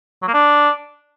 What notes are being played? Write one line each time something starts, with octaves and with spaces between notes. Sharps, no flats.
F#3
A#3
D4